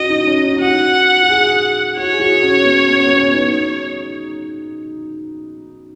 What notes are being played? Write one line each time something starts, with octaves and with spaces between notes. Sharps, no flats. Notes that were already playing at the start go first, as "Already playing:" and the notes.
Already playing: C#4 F#4 D#5
D#4
C#4
D#4
D#4
F#4 F#5
F#4
G#4
F#4 C#5
G#4
F#4
C#4
B3
C#4
B3
C#4
D#4